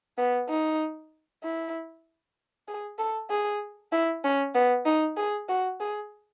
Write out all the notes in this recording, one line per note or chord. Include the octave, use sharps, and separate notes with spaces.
B3
D#4
E4
G#4
A4
G#4
E4
C#4
B3
D#4
G#4
F#4
G#4